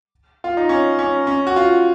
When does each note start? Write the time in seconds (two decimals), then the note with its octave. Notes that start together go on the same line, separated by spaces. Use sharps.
0.44 F4
0.57 D#4
0.69 C#4
0.99 C#4
1.27 C#4
1.47 F#4
1.56 F4